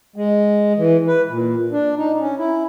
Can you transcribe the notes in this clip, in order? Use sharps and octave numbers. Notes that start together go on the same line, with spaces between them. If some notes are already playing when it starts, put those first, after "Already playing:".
G#3
E3
B4
A#2
D4
D#4
C#4
E4